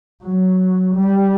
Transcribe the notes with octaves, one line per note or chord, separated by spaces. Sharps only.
F#3
G3